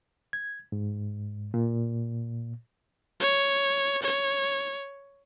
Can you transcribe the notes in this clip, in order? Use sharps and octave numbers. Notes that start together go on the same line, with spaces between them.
G#6
G#2
A#2
C#5
C#5